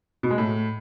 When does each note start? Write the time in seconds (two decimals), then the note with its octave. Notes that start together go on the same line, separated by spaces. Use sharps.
0.23 B2
0.31 G#3
0.38 A2